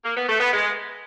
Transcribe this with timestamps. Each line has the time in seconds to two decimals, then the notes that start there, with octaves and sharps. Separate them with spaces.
0.05 A#3
0.17 B3
0.29 A3
0.40 B3
0.52 G#3